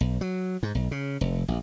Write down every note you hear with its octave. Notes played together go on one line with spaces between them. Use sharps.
B1
F#3
G#2
B1
C#3
F1
A#1